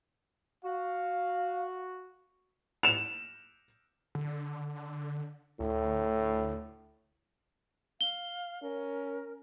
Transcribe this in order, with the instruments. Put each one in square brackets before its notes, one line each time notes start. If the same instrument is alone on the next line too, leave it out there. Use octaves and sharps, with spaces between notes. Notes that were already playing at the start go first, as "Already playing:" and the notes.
[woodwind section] F#4 [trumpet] F5
[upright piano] E7 F7
[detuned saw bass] D3
[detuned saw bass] D2 [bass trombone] A2
[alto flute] F5 [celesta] G7
[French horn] C#4 [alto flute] A#4